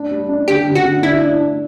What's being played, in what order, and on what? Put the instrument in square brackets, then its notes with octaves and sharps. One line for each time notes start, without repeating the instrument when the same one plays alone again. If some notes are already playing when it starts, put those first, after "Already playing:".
Already playing: [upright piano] D4
G3
D4
[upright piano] D3 [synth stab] G4
[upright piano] D3
[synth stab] F#4
[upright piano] D3
[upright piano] D4 [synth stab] E4
[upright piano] D4
D4